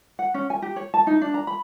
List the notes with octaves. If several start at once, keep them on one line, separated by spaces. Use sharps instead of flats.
F#5
C#4
G#5
G4
C#5
A5
D#4
D4
A#5
B5